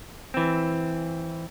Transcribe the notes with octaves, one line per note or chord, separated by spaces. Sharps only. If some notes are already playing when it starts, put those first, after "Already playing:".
E3 C4